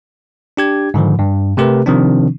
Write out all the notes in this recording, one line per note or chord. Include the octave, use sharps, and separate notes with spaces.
D4 G4 G#6
G#2 D3 D#3 F3
G2
C3 A3 G4 A#4 B4
C3 D#3 F3 C4 D4